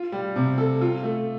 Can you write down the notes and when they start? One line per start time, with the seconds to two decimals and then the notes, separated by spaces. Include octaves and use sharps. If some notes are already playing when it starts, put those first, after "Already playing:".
Already playing: F4
0.12 G3
0.36 C3
0.58 A4
0.81 F4
1.03 A3